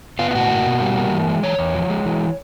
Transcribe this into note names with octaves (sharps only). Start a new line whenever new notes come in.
B3 F4
F4
A2 F#4
A#3
B2
G3
A#3
E3
G#3
E3 C#5
E2
F3
G#3
E3